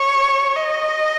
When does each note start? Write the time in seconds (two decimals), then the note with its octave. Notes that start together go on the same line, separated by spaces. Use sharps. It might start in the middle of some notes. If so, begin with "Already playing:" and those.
Already playing: C#5
0.56 D#5